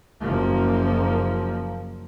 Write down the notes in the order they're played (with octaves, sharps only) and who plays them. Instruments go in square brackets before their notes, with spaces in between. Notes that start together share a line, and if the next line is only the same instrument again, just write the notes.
[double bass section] F#1 F3 A#3